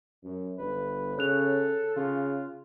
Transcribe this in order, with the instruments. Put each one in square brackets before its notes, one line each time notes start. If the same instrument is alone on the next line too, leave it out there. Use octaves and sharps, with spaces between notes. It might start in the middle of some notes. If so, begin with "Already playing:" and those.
[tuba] F#2
[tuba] G1 [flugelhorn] B4
[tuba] C#3 [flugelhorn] A4 [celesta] C#5 F#6 F7
[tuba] C#3 [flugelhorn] F4